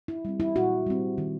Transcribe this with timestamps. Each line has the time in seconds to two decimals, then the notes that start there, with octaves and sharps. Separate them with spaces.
0.08 E4
0.25 G3 C4
0.40 E4
0.55 A#2 F#4
0.87 G3 C4
1.18 D#3